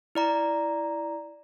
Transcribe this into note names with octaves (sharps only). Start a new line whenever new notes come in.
E4 D5 A#5